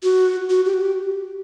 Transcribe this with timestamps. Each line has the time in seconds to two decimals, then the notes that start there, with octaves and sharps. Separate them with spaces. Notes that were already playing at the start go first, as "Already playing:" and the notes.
0.03 F#4
0.50 F#4
0.65 G4
0.74 F#4
0.81 G4